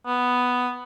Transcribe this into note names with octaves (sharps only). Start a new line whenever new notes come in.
B3